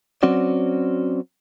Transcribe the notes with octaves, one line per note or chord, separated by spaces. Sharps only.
F#3 C4 C#4 F#4 D5